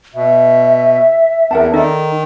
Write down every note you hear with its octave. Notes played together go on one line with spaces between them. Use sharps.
B2 E5
E2 A#4 F#5 A5
D#3 D#4 A4 D5